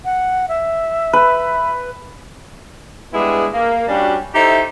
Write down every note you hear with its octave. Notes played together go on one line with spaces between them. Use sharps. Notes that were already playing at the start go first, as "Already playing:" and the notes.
F#5
E5
B4
G3 G#3 B3 D4 E4 G#4
A#3
G3 C#4 D4 F#4
D#4 E4 G4 A4 C5 E5